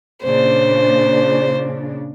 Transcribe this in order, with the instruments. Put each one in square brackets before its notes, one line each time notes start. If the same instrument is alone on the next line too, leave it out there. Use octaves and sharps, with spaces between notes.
[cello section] A#2 C#3 D4 [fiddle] C5